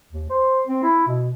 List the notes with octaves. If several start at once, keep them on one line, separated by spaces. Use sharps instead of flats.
D#2
C5
C4
E4
B2